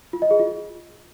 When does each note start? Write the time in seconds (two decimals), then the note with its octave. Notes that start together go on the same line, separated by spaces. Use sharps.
0.13 F4
0.22 D#5
0.31 G#4
0.39 F4